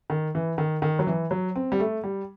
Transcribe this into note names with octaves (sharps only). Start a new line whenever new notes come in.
D#3
E3
D#3
D#3
F#3
E3
F#3
C4
G3
A3
G3